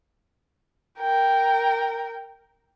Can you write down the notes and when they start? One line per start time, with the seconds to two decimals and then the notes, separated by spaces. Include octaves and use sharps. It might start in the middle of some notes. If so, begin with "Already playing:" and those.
0.98 A#4 G5